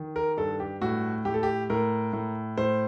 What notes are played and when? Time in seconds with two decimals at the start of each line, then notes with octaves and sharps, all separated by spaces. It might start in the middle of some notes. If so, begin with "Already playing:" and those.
Already playing: D#3
0.16 A#4
0.37 G2 A4
0.60 G4
0.82 A2 F#4
1.25 A2 G4
1.34 A4
1.43 G4
1.70 A2 A#4
2.13 A2
2.58 A2 C5